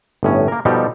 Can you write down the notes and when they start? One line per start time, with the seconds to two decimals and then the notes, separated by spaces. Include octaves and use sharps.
0.23 G1 A2 C#4
0.48 A#3 A#4
0.65 B2 F3 G3 D#4 G4 A4